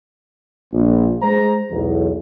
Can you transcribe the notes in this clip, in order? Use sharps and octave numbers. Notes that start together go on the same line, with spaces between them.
A#1
G#3 C5 A#5
B1 E2